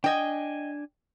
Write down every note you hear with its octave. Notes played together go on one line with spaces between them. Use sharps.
D4 D#5 G5 G#5